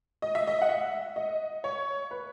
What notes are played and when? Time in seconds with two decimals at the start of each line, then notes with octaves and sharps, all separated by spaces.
0.22 D#5
0.35 E5
0.47 D#5
0.62 F#5
0.69 E5
1.16 D#5
1.64 C#5
2.11 B4